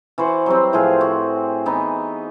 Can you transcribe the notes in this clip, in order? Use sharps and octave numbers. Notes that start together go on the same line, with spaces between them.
E3 F#4 C5 F#5
F#3 G3 C4
A2 F3 G#4 F5
F#4
E3 B3 D#4